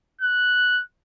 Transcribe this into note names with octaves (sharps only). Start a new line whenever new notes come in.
F#6